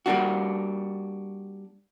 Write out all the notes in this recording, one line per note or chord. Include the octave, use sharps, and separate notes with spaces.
G3 A#3 D4 F#4